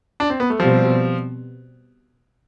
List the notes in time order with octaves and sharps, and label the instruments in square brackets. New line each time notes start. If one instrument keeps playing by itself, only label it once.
[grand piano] D4
C4
B3
A3
[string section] B2 G3 C4 [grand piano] F3